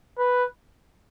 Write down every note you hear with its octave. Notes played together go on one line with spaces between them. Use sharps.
B4